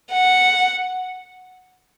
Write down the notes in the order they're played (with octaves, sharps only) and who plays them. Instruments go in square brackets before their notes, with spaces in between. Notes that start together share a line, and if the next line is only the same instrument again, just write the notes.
[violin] F#5